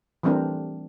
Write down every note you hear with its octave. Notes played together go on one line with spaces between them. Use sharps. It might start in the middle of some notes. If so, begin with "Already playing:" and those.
E3 G3 A3 C4 D4 A#4